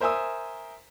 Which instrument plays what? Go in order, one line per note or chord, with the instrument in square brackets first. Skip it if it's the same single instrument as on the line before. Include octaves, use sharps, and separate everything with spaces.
[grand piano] A#4 C5 E5 G#5 D#6 E6